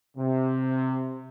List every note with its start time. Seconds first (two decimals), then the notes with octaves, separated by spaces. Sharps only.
0.17 C3